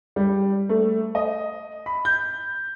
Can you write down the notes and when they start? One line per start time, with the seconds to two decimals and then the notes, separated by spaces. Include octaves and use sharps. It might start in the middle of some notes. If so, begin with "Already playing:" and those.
0.16 G3
0.69 A3
1.15 D#5
1.86 B5
2.05 G6